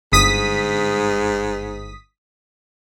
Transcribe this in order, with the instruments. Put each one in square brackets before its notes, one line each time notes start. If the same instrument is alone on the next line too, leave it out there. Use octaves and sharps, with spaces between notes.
[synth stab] G1 D#6 B6 [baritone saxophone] G#2